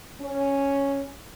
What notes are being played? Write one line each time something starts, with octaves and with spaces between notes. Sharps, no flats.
C#4